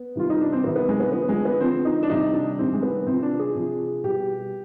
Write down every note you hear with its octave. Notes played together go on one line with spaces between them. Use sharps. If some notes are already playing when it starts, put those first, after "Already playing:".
Already playing: B3
C3 D#3 G3 F4
D#4
D4
C4
C3 D#3 G3 B3
B3
G#3
B3
D3 F3 B3
G#3
B3
D3 F3 C4
D#4
D4
C3 D#3 G3 D#4
D4
C3 D#3 G3 C4
G#3
B3
C3 F3 C4
D4
G#4
C3 F3
B2 G3 G4